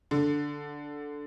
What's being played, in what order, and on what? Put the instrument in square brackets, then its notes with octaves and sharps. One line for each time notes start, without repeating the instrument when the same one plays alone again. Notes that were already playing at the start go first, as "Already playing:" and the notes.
[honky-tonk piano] D3